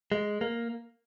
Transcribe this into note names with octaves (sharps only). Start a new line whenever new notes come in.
G#3
A#3